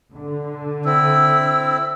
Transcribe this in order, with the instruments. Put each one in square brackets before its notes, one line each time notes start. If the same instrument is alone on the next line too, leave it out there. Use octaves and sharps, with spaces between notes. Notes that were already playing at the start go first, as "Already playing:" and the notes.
[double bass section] D3
[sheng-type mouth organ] C4 E4 [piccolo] E6